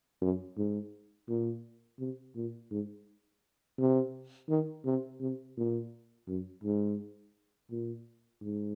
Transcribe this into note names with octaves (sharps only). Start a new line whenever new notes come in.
F#2
G#2
A#2
C3
A#2
G#2
C3
D#3
C3
C3
A#2
F#2
G#2
A#2
G#2